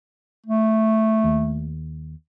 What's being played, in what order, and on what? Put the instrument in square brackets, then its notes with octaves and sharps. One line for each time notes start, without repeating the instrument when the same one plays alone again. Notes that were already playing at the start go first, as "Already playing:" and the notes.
[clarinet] A3
[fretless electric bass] D#2